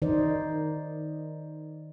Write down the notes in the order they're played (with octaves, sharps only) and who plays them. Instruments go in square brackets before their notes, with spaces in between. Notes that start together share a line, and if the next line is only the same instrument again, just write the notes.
[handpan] D#3 D#4 C5 D5